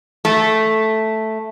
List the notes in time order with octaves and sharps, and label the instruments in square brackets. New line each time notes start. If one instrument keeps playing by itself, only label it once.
[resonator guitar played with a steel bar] A3